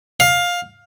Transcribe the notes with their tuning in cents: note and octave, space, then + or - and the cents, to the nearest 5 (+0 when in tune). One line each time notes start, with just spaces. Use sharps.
F5 +15